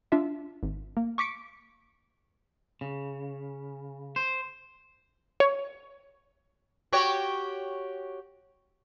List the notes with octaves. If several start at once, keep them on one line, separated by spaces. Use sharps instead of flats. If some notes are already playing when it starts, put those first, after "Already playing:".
D4 F4 E5
G#1
A#3
C#6 D6 B6 C#7 D7
C#3
C5
C#5
F#4 G4 C#5